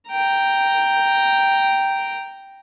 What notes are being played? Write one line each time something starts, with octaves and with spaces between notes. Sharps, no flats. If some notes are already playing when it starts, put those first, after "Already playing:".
G5 A#5